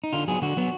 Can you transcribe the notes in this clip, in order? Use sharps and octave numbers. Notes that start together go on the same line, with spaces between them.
D#4
D3 F4
F#3 B3 G#4
D3 F#4
F#3 B3